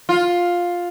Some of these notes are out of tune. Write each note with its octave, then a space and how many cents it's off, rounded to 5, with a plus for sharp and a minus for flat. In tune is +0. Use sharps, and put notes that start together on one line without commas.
F4 +10